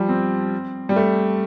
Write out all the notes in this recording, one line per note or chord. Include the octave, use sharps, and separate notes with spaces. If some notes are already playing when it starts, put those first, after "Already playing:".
Already playing: F3 G3
C4
G3
A3